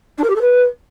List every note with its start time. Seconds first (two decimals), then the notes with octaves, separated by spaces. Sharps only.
0.17 D4
0.23 A#4
0.29 G4
0.35 A4
0.41 B4